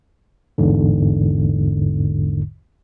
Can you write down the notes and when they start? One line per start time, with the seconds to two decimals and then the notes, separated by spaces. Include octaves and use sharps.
0.58 A1 E2 G#2 D3